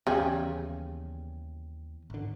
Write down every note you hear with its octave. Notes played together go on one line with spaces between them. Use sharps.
D#2 C#3 E3 G3 B3 G#5
G#1 D3